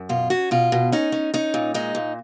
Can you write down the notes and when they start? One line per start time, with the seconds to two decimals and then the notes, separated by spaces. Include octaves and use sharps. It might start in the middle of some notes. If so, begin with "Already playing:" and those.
Already playing: F#2
0.09 B2 F4
0.30 C#4 F#4
0.51 B2 F4
0.72 B2
0.92 C#4 D#4
1.12 C#4
1.34 C#4 D#4
1.54 A#2
1.74 G#3 D#4
1.95 A#2